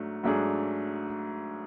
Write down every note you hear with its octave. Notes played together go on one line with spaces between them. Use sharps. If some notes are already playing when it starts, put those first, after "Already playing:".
Already playing: G#2 F#3 A3 D4
G#2 F#3 A3 D4 G#4